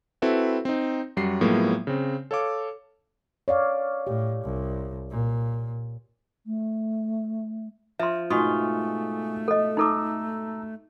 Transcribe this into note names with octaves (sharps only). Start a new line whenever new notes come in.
C4 E4 F#4 A4 B4
C4 D#4
F#2 G3 F#4 C7
A2 F3 F#3 G#3 A#3 B3
C#3 C4
A4 C#5 F5 D6
C#5 D5 F5
A2 G4
C2
A#2
A3
F3 E5 C6
G#2 B2 A3 F4 G#5 C#6 D#6
A4 D#5
D#4 A4 A5 A#5 D6 E6